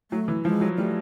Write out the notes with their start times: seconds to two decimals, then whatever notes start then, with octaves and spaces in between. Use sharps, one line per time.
0.11 F#3 A3
0.28 E3
0.45 F3 G#3
0.61 F#3
0.77 G3 A3